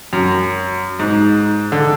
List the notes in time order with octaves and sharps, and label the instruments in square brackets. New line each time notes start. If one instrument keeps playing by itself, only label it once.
[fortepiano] F#2
G#2
D3